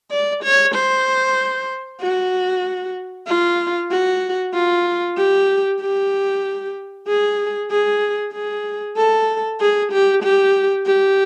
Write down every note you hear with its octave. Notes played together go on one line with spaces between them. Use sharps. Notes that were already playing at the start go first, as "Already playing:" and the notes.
D5
C#5
C5
F#4
F4
F#4
F4
G4
G4
G#4
G#4
G#4
A4
G#4
G4
G4
G4